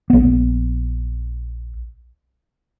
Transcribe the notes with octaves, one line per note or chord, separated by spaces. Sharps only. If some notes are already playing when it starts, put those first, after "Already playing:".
A#1 B3